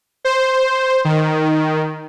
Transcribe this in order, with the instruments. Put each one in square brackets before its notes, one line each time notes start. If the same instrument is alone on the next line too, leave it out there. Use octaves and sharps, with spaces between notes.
[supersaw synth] C5
D#3